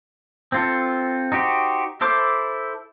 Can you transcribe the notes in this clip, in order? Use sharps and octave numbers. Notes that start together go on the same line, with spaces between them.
C4 F4 A4
D#4 F#4 G4 C5
E4 A4 C5 D6